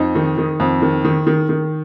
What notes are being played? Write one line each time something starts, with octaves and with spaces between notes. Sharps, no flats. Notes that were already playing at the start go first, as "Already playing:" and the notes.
Already playing: F2 D#4
D#3
D#3
F2
D#3
D#3
D#3
D#3